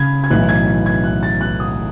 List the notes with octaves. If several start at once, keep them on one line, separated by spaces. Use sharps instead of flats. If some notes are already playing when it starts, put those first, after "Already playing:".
Already playing: C#3 B5 G#6
G#6
B1 A2 E3 F#6
G#6
G#6
G#6
F#6
A6
F#6
D#6